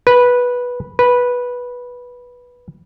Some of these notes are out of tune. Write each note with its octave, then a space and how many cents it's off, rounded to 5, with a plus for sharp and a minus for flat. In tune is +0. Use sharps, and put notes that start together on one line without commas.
B4 -10
B4 -10